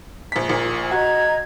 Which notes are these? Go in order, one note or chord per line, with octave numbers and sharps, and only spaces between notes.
A#1 B6
A#1 A#2
F#4 D#5 A#5 G#6